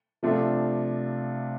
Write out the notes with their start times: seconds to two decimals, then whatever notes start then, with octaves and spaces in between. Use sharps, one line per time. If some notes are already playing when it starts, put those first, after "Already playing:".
0.23 C3 F3 A3 D4 F4